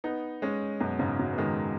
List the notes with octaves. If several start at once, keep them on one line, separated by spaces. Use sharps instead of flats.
B3 D#4
G#3 C#4
F#2 B2
G#2 C#3
C#3 F#3
B3
D#3 G#3